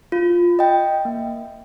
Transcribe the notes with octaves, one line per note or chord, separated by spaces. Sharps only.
F4
D#5 G5
A#3